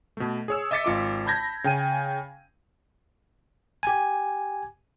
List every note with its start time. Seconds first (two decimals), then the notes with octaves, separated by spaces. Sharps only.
0.17 B2 A3
0.48 G#4 C#5 E6
0.71 D#5 E5 D6 A6 B6 C#7
0.84 G#1 F4 D6
1.26 A5 B5 G6 G#6 A#6
1.64 C#3 G5 G#5 D#7
3.83 G4 G#5